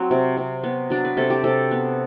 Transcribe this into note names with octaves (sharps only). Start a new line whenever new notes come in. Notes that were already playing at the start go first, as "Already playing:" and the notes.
Already playing: F#3 C4
C3
C3
B3
F#3 D4
B4
C3 A4
G4
C3 A4
B3